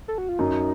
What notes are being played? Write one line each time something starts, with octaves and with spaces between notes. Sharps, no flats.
A4
F#4
F4
F#2 D#4